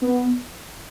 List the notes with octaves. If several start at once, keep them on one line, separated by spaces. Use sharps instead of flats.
B3